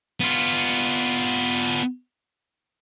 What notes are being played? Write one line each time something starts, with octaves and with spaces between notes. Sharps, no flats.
B3 F4